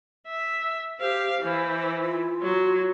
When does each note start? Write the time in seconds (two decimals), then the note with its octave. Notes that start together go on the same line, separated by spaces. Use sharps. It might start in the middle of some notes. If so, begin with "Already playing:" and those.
0.28 E5
1.00 G4 C5 F5
1.42 E3 C5
2.02 F4
2.42 F#3